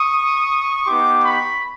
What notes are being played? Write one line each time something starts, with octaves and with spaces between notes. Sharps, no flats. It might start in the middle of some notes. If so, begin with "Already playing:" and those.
Already playing: C#6 D#6
B3 D#4 G4 C6 D6
B5 C#6